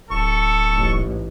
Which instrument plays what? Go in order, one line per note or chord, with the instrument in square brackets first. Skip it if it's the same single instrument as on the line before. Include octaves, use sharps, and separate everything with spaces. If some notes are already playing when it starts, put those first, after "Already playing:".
[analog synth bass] D1 [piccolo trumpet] A4 [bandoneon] C#6
[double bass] A1 G#2